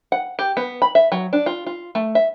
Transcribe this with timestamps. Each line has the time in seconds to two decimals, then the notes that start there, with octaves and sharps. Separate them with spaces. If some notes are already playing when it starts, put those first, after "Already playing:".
0.12 F#5
0.39 G4
0.57 B3
0.82 B5
0.95 E5
1.12 F#3
1.33 D4
1.46 F4
1.66 F4
1.95 A3
2.15 E5